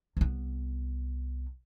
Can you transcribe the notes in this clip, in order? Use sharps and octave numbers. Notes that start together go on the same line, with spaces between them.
C2 B3